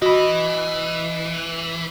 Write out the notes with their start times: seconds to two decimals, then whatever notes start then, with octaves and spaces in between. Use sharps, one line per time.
0.02 E3 F#4 D#5 B5